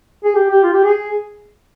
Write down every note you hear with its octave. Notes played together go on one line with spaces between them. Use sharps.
G#4
G4
G4
F4
G4
G#4